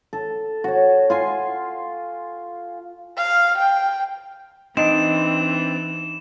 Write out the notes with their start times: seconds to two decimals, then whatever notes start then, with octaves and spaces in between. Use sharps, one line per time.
0.13 A4
0.64 F#4 C#5
1.10 F4 G#5 C6
3.18 F5
3.58 G5
4.77 E3 C4 D4 D#4 E7